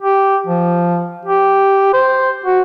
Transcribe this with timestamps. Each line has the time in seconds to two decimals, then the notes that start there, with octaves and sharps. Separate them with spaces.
0.02 G4
0.47 F3
1.25 G4
1.93 C5
2.45 F#4